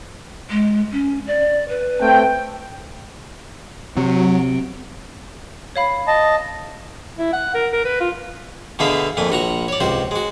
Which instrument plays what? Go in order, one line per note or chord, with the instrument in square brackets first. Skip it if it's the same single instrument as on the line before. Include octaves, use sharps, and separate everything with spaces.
[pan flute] G#3
C#4
D5
B4
[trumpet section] A3 C4 G5
[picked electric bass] C3 [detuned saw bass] F#3
[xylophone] C#5 F5 B5
[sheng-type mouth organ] D#5 A5
[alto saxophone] E4
F#5
A#4
A#4
B4
F4
[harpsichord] B2 D3 A3 G#4 E5 F5
F2 A#2 A3 G#5
A#1 F#4 A#5 C#6
C#5 D5
C#2 C3 F#4 C5
G#3 F#4